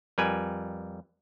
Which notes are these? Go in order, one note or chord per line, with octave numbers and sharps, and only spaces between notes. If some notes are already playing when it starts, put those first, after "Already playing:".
F2 G3 A#4 B4 G#5